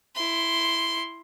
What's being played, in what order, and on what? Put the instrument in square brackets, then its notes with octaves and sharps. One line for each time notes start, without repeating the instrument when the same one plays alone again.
[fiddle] E4 C6